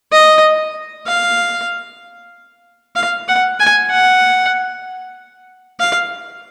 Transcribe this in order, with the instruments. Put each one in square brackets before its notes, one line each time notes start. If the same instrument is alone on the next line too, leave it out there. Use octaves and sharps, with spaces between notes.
[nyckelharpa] D#5
F5
F5
F#5
G#5
F#5
F5